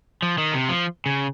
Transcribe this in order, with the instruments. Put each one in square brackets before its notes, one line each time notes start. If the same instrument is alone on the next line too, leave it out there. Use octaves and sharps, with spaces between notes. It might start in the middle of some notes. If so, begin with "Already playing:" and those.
[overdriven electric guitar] F3
D#3
C3
F3
C#3